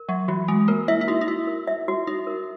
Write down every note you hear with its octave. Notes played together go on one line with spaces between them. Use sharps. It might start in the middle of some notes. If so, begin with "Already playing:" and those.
Already playing: A#4
F#3 E5
E3 F#4
G#3 F#4
A#3 A#4
E4 E5
E4
D#4 F#4
D#4
E4 F#4
A#4
E5
F#4
D#4 F#4
A#4